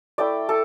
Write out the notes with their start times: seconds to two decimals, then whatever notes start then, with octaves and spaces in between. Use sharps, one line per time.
0.18 A3 E4 D5 G5
0.49 A4